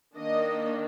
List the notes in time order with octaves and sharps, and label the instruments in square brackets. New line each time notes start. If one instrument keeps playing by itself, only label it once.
[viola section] D#3 A#3 D4 D#5